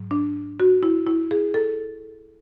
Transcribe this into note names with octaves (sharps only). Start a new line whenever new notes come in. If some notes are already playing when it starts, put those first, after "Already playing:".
Already playing: G#2 F#3
D4
F#4
E4
E4
G#4
A4